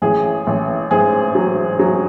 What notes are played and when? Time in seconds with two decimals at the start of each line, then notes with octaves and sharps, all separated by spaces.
0.02 A1 G#4
0.47 A1
0.91 G#2 G#4
1.35 F#3
1.79 F#3